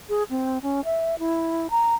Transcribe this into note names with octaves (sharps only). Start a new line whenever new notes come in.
G#4
C4
C#4
E5
E4
A#5